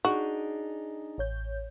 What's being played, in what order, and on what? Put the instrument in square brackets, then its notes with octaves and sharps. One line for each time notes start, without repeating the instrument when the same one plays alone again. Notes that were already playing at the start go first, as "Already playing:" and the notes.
[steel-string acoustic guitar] D4 D#4 G#4 [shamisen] F#4
[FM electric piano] A1 C#5 G6